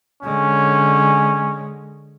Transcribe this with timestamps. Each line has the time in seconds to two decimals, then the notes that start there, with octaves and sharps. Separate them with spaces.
0.23 D3 G#3 C#4